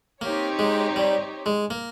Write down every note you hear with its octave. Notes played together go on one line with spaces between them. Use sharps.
A#3 C4 D#4 G4 C#5
G#3
G3
G#3
A#3